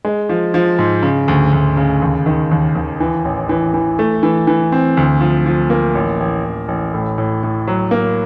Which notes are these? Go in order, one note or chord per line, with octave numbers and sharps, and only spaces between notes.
G#3
F3
F3
G#2
C#3
D2
D2
C#3
D#2
D#3
D#2
D#2
E3
A1
E3
E3
A3
E3
E3
C4
D2
F3
F3
A#3
A1
A1
A1
A1
A2
A2
A2
F#3
A#3